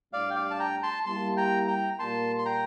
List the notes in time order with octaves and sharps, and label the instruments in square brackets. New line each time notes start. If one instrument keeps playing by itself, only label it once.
[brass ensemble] A2 G3 D4 [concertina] D5 F5
[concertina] G5
D5 F5
A5
G5 A#5
A5 C6
[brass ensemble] G3 A#3 E4 G4 [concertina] A5 C6
[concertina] G5 A#5
G5 A#5
[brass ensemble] A#2 G3 A#3 [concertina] A5 C6
[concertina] C6
G5 A#5